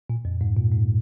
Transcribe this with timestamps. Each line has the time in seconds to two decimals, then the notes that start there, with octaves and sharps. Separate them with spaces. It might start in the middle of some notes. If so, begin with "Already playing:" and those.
0.10 A#2
0.25 F2
0.41 G#2
0.57 A#2
0.72 G#2